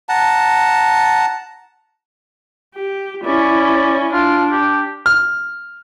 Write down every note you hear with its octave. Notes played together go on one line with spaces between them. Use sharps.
F#5 A5 A#5
G4
C#4 E4 D5
D4 F4
G4
F6